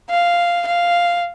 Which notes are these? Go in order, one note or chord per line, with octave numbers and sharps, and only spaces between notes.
F5
F5